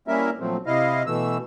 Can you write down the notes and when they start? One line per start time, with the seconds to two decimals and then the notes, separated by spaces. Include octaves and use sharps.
0.08 G3 A#3 C#4 E4 A#4 E5
0.40 A#2 F3 F#3 A3 C4
0.66 C3 E4 D#5 F5
1.07 B2 E3 A3 E6